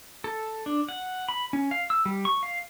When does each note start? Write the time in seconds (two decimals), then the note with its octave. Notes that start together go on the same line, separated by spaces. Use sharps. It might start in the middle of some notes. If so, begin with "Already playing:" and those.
0.24 A4
0.66 D4
0.89 F#5
1.29 B5
1.53 C#4
1.71 F5
1.90 E6
2.06 G3
2.25 C#6
2.43 F5